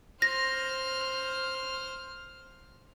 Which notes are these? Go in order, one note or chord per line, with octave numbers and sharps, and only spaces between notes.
C5 F6 A#6